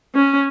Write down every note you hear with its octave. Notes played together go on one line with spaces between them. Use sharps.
C#4